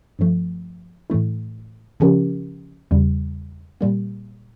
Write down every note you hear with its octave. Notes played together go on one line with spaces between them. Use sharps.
G2 F3 A3
A2 E3 A3 E4
C#3 F3 C#4 G4 A#4
E2 C#3 G3
A#2 G3 A#3